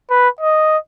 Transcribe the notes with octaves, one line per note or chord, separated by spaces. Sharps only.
B4
D#5